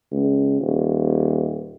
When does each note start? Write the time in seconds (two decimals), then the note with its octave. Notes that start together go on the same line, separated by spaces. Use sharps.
0.11 C#2
0.60 D#1